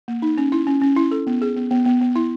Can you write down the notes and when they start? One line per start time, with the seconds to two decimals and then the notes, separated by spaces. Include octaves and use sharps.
0.08 A#3
0.22 D#4
0.38 C#4
0.52 E4
0.67 C#4
0.82 C#4
0.96 E4
1.11 A4
1.27 B3
1.42 G#4
1.56 B3
1.71 B3
1.86 B3
2.01 B3
2.16 E4